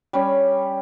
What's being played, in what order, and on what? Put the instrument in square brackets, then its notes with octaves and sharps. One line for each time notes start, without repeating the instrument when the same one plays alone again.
[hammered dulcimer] G3 C#4 C#5